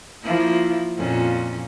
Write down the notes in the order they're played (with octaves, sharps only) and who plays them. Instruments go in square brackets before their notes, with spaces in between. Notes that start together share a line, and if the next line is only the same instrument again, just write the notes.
[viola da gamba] F3 A#3 E4
F2 A#2 C#4